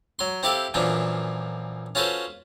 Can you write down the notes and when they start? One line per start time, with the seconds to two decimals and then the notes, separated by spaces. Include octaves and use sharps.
0.19 F#3 C6
0.43 C4 E4 G4 A4 F5
0.74 F#2 A#2 E3 F3 D4
1.95 C#4 F4 F#4 A4 B4 C5